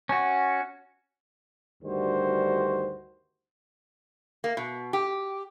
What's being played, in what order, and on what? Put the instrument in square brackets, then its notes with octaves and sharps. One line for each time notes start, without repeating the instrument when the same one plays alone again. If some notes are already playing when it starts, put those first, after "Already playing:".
[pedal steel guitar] C#4 F#4
[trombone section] D2 G2 D#3 G3 F#4 C5
[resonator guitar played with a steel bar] A#3
B2
G4